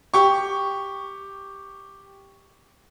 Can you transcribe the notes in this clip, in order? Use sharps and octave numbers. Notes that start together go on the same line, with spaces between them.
G4 C#6